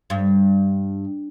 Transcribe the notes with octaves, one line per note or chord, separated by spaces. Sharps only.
G2